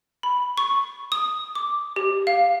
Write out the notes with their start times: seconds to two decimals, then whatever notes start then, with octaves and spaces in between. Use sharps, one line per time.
0.23 B5
0.58 C#6
1.12 D#6
1.55 D6
1.96 G4
2.27 F5